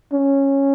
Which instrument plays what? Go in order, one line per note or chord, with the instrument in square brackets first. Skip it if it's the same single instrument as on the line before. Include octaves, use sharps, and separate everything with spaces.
[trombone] C#4